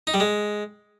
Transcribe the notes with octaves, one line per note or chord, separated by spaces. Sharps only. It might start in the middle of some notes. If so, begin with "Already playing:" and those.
D#4
G3
G#3